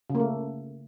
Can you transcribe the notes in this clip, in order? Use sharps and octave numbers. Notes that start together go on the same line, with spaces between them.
C#3
A#3
A3